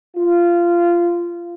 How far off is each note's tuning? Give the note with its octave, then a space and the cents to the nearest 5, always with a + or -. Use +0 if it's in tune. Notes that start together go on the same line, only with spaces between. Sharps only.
F4 -15